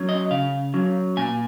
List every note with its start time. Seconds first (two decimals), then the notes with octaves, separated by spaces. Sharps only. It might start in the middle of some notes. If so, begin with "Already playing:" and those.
Already playing: F#3 C#4
0.09 D#5
0.31 C#3 F5
0.74 F#3 C#4
1.17 A#2 G#5